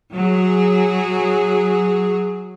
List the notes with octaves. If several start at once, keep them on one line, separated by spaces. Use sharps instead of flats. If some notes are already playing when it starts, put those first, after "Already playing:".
F#3 G#4